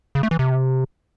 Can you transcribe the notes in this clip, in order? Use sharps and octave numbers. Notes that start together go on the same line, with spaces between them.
C#3
A3
E3
C3